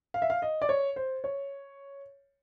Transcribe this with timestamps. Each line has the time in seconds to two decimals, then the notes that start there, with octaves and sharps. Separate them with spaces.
0.14 F5
0.22 E5
0.30 F5
0.42 D#5
0.62 D5
0.69 C#5
0.96 C5
1.24 C#5